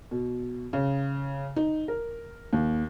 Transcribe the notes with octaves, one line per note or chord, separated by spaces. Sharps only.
B2
C#3
D#4
A#4
D#2